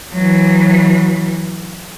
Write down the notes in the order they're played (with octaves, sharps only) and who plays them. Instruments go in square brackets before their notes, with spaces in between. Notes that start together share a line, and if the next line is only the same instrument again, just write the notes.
[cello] E3 F#3